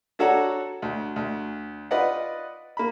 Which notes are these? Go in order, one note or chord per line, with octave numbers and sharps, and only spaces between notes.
D4 F#4 A4 C#5 F#5 A#5
D2
D2
F4 B4 D5 D#5 F#5
A#3 B5